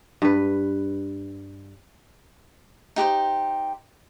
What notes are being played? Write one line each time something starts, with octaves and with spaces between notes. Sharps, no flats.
G2 B4
D#4 G4 B4 C5